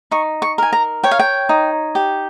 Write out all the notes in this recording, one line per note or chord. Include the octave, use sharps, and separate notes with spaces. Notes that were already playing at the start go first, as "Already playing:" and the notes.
D#4 C#6
C#6
A#4 G#5
A#5
C#5 G5
F5
G5
D#4
G4